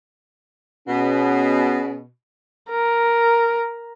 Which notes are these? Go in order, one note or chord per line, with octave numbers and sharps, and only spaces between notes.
B2 C#4 G#4
A#4